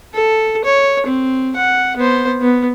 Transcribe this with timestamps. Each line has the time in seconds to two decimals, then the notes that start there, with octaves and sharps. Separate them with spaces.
0.14 A4
0.64 C#5
1.06 C4
1.56 F#5
1.97 B3 C5
2.41 B3